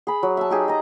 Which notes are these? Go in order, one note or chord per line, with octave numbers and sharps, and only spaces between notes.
G#4 B5
F#3
E5 A5
D#4 G4 G#4
D#5 A#5